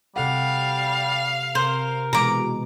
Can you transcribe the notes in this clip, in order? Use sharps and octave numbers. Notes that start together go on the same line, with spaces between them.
C3 G3 A4 F5 F#5
C3 A#4 C5
B2 E3 G#3 A#5 D6